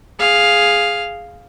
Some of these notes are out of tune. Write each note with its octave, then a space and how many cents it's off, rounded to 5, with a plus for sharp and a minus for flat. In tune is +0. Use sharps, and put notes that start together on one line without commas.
G#4 +0 F5 +0